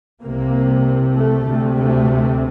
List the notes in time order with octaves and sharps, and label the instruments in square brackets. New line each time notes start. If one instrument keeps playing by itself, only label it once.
[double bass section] C2 C3 A#3
A3
D2 C3
A3